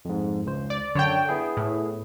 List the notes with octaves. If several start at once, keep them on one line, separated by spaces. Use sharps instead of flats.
F2 G#2
C#2 C5
D5
F#2 D3 C#5 G5 A5
B3 E4 G#4
A2